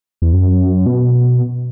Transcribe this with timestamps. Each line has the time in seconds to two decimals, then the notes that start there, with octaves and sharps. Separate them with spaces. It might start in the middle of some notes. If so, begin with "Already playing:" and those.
0.22 E2
0.33 F#2
0.86 B2